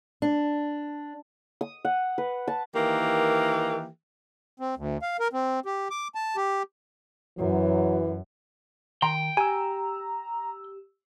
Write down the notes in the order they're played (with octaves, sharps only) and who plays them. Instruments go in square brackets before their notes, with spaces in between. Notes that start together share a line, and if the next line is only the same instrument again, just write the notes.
[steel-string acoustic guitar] D4
[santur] D#6
F#5
B4
A5
[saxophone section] D#3 E3 A#3 G4
[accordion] C4
D2
F5
A#4
C4
G4
D6
A5
G4
[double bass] F#2 [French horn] E3 [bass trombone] F#3
[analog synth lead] D#3 [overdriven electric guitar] G5 [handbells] A#5 C6
[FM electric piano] G4 E6 [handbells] G#5 [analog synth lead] A#5